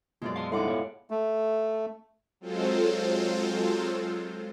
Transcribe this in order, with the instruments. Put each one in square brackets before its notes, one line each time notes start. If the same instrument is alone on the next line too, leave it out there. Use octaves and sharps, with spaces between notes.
[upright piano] F#2 B2 [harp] G#3 F4 D5
[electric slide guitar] F5 A5 [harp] C6
[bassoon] A2 [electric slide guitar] G3 G#3 D#4 [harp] F5 F#5 D6
[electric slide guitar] B3 G#4 C#5
[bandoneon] A3
[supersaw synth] F#3 G#3 C4 F4 A4 C5